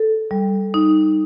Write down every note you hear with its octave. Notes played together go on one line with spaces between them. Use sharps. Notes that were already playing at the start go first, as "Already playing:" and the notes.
Already playing: A4
G3
D#4